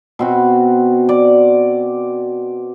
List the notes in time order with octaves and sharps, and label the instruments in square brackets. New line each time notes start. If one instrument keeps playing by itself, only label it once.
[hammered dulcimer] B2 C4 F#4
D5